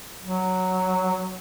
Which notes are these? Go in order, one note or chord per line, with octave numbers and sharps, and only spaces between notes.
F#3